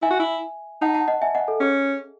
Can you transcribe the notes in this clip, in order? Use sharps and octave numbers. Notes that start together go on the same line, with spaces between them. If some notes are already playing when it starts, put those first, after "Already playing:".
E4 E5 G#5
F#4
E4
D#4 F#5 A5
F#5 A5
D#5 F#5
E5 G#5
D#5 F#5
A4
C#4 G#4